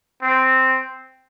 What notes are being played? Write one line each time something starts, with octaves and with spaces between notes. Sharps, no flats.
C4